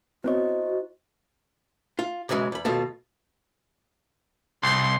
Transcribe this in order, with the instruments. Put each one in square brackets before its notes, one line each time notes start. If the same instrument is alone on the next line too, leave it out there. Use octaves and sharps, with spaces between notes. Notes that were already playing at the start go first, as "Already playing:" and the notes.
[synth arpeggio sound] B3 C4 C#5 [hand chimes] E4 C5 D#5 [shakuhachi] F#4
[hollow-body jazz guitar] F4
B1 F#2 C#3 E3 G#3
E2 B5
D#2 B2 F4 A4
[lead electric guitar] C2 [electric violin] C6